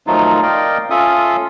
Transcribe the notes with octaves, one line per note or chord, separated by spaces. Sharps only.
D#3 F3 F#3 A3 D#4 F4
A#4 D5 D#5 F5 G5
C#4 F4 A4 E5 F5 D#6